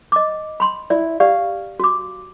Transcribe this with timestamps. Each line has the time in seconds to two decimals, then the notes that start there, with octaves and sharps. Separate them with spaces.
0.12 D#5 D6
0.60 B5 C6
0.90 E4 D5
1.20 G4 D5 F5
1.80 F#4 D6